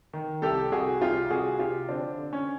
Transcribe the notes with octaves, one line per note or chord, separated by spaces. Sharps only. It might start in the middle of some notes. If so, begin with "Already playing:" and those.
D#3
C2 G4 A4
C2 F#4 G#4
C2 F4 G4
C2 F#4 G#4
C3 F4 G4
D3 C4 D4
D3
C#4